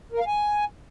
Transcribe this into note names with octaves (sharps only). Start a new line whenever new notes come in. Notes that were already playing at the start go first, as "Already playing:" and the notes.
A#4
F5
G#5